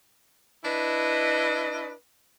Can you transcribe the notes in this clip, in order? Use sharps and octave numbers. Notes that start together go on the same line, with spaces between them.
D4 E4 B4 D#5